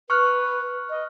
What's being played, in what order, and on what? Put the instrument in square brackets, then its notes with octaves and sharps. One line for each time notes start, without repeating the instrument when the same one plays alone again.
[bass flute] B4 [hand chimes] C#6 F6 F#6
[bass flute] D#5